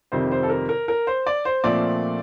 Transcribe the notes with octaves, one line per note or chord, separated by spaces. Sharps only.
F2 C3 D#3 G3 C4 C5
C5
A4
A#4
A#4
A#4
C5
D5
C5
A#2 F3 A3 C4 D5